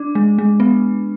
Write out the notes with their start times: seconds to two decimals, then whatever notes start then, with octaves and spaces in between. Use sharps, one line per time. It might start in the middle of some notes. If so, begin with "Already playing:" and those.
Already playing: D4
0.15 G#3
0.39 G#3
0.60 B3